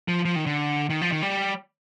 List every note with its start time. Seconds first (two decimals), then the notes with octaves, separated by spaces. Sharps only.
0.08 F3
0.25 F3
0.36 D#3
0.46 D3
0.90 D#3
1.01 F3
1.12 D#3
1.22 G3